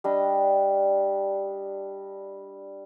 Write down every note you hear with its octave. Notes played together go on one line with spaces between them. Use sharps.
G3 D4 D#5